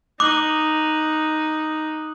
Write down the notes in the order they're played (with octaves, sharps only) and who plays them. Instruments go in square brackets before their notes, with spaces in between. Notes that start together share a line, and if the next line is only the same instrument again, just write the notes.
[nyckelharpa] D#4 [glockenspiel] D6 [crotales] D#6 F#6 F#7